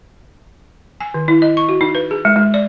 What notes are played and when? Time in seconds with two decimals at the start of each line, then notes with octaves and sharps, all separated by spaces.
1.00 G#5
1.14 D#3
1.28 E4
1.42 D#5
1.57 C#6
1.69 F#4
1.81 D#4
1.95 B4
2.11 G#4
2.25 G#3
2.36 G#3
2.54 D5